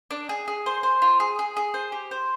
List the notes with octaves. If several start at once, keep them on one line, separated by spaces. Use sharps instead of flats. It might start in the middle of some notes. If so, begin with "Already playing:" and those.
D4
G#4
G#4
C5
C5
F4
G#4
G#4
G#4
C5
G4
C5